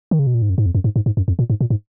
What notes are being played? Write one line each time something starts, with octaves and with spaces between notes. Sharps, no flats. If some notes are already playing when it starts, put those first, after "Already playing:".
D#3
C#3
B2
A#2
G#2
F#2
G#2
F2
F#2
G#2
G#2
G#2
F#2
F2
A#2
G#2
A#2
G#2